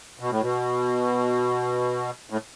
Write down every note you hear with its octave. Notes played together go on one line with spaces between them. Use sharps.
B2
A2
B2
A2